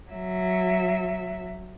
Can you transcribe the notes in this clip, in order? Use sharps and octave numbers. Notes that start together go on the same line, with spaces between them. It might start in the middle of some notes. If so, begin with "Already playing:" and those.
F#3 E5